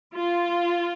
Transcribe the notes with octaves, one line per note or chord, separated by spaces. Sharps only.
F4